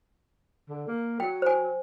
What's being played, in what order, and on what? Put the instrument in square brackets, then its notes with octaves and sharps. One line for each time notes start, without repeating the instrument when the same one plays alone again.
[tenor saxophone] D3
A#3
[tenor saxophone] F#3 [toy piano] G5
[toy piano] C5 G#5